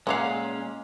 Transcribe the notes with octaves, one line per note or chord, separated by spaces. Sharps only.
A#2 G#3 C#4 C#5 D#5 F5 F#5